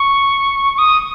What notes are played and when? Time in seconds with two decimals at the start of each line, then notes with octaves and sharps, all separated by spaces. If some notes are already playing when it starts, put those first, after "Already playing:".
Already playing: C#6
0.74 C#6
0.78 D#6